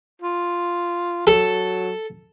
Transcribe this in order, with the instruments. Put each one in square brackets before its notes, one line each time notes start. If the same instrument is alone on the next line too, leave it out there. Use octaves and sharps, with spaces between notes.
[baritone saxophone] F4
[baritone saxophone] F#3 [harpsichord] A4